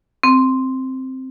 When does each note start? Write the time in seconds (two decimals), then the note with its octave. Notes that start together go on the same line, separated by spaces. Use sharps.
0.24 C4